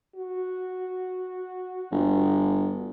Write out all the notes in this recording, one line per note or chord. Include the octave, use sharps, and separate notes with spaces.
F#4
G1